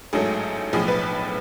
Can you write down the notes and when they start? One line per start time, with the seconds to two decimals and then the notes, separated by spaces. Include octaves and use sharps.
0.13 A1 G#2 F#3 A3 G#4
0.73 B1 A2 F3 G#4
0.88 B4